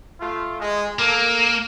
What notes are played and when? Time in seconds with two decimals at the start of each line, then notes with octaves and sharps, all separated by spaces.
0.21 A3 F4
0.60 G#3
0.99 A#3 A4 A#4 D6